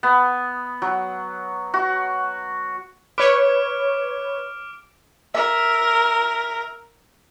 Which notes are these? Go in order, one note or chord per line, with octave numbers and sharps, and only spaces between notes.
B3
F#3
F#4
B4 C#5 D6 F6 D7
A#4 E5